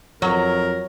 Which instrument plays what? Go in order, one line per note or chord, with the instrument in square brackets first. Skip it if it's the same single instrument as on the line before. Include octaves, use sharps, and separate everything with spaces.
[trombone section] F2 [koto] F#3 [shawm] A#4 [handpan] C#5